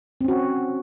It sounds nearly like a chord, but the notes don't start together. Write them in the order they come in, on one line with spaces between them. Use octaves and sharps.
C4 C#4 F#4